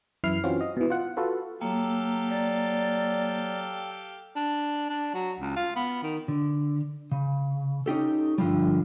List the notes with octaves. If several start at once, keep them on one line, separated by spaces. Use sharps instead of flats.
F#2 E3 E4 F6 C7
E3 C4 C#4 F4 F#4
D#5
B2 E3
F4 F#5
F4 F#4 A4 B4
F#3 A#3 G4 A4 F5
D5
D4
D4
F#3
C#2
F4
B3
D#3
D3
C#3
C#4 D#4 G4 A4
G2 D3 F3 G3